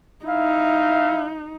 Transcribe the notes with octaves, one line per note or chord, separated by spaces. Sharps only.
D#4 E4 E5 F5